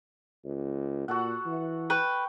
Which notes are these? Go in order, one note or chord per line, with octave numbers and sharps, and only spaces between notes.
C#2
A#2 F#4 A4 F#5
E3
B4 G5 C#6 E6